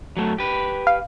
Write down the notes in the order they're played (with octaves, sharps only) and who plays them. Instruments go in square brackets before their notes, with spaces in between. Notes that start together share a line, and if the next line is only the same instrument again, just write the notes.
[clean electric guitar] F#3 A3
G4 B4
[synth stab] F5